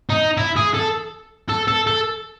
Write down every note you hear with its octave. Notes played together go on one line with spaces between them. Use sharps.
D#4
E4
G#4
A4
A4
A4
A4